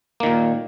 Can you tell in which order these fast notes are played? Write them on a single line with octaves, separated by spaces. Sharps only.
A#3 D#3 A#2